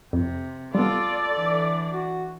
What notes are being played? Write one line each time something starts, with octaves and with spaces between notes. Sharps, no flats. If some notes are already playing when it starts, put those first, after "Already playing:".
F2 C3
G3 B3 F4 A4 D5
D3 E3
F#4